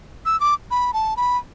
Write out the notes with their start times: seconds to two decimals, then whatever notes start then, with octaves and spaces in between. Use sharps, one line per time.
0.26 E6
0.40 D6
0.71 B5
0.94 A5
1.17 B5